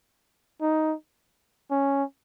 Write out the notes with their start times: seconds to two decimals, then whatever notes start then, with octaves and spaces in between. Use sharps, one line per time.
0.61 D#4
1.71 C#4